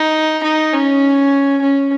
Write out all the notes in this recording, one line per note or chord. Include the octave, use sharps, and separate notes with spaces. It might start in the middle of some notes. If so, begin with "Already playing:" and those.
Already playing: D#4
D#4
C#4
C#4